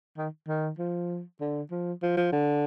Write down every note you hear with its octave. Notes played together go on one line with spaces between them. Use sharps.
D#3
D#3
F3
D3
F3
F3
F3
D3